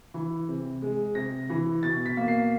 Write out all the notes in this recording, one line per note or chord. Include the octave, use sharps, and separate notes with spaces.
E3
C3
G#3
C3 A#6
E3
B2 A6
B6
A#3
C7